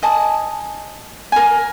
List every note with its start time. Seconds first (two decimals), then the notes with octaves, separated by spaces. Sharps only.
0.03 D#5 G#5 A5
1.32 A#4 G#5